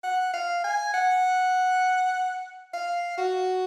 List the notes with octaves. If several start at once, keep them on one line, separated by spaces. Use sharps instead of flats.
F#5
F5
G#5
F#5
F5
F#4